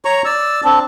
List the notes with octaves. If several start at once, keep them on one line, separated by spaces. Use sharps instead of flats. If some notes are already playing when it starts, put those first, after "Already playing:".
C#5 A#5 C#6
D5 E6
C4 D4